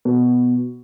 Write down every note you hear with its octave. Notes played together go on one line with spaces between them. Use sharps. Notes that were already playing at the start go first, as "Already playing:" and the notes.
B2